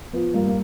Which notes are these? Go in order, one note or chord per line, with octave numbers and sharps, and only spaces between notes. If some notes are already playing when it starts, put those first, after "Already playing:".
F3 B3
G2 A#3
A#3